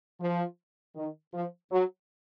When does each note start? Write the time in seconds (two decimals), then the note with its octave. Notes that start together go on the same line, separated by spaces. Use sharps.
0.21 F3
0.95 D#3
1.33 F3
1.72 F#3